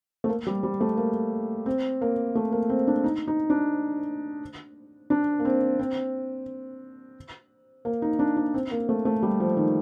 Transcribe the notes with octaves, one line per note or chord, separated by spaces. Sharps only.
A3
A#3
G3
G3
A3
A#3
C4
A#3
A3
A#3
C4
D4
D#4
D#4
D4
D4
A#3
C4
C4
A#3
D#4
D4
D4
C4
A#3
A3
A3
G3
F3
D#3